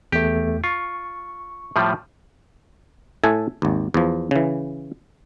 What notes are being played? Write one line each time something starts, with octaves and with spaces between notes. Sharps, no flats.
E2 A3 G4
F4 C#6
A2 F3 G3
A2 A4 E5 G#5
G#1 D#2
E2 F3
C#3 E3